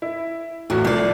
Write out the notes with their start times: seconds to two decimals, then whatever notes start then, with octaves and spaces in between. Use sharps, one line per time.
0.02 E4
0.70 E2 A2 F#4
0.85 C2 F2 A3 D5